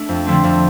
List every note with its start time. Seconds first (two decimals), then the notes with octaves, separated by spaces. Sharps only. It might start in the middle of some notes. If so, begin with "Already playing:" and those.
Already playing: A3 D4
0.09 F2
0.27 D3 F3 A3 C4
0.43 F2